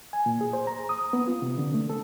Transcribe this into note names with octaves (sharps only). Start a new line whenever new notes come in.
G#5
A#2
G#4
C5
A#5
D#6
B3
F4
C3
D3
A3
A4